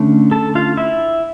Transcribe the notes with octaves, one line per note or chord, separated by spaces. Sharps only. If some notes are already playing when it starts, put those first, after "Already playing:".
Already playing: D3 A3 C#4
A4 A5
F4 F5
E4 E5